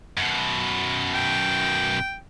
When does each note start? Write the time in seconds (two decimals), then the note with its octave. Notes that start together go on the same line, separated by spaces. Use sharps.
0.17 F#2 B2
1.14 G5